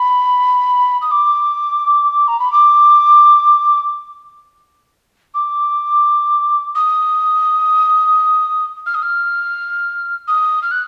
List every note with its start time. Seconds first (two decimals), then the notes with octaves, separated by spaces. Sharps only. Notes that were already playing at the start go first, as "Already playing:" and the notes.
Already playing: B5
1.01 D#6
1.11 D6
2.28 A#5
2.39 B5
2.52 D6
5.34 D6
6.75 D#6
8.86 F6
8.94 D#6
9.02 F6
10.28 D#6
10.62 F6
10.71 F#6